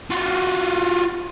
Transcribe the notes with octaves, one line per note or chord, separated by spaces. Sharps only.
F4 F#4